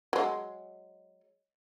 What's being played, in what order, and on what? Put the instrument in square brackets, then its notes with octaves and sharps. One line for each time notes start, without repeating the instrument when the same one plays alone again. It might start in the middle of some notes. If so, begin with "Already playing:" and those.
[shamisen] F#3 G#3